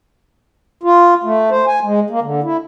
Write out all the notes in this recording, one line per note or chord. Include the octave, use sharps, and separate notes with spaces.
F4
A3
C5
G#5
G#3
A#3
D3
E4